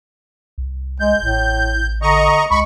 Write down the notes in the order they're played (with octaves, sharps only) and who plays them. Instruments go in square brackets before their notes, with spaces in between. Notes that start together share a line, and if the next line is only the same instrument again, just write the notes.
[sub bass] C2
[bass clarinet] G#3 [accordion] G6
[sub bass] A1 [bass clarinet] A2
[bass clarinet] D3 [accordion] D#5 A#5 C#6
[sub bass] C#2 [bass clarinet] G#3 [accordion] B5 C#6